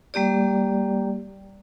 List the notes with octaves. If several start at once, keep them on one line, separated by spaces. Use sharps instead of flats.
G3 A#3 G4 D5